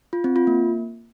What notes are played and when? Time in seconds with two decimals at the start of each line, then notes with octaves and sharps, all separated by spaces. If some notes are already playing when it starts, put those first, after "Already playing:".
0.13 F4
0.24 C4
0.36 F4
0.47 A#3